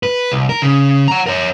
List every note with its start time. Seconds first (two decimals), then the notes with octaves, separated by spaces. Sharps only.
0.03 B4
0.32 C2
0.49 A#4
0.62 C#3
1.08 F#5 A#5
1.26 A#4 C#5